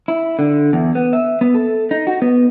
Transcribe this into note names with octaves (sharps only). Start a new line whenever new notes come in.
E4
D3
E2
B3
E5
B3
A4
D#4
F#4
B3